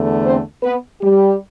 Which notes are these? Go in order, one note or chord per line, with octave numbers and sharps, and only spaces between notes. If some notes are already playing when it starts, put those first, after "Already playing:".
Already playing: E2 D3 A3
C4 C5
B3 B4
G3 G4